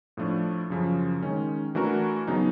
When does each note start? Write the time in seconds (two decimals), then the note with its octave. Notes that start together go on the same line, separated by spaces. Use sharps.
0.17 A2 F3 A3 D4
0.70 F#2 C#3 F3
1.22 D#3 G#3 C#4
1.75 E3 A3 D4 F#4 A#4
2.27 C#3 F#3 B3 D#4